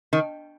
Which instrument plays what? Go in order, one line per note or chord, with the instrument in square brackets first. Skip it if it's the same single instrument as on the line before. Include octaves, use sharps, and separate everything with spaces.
[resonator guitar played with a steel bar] D#3